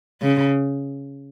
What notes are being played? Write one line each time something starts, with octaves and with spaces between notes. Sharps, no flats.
C#3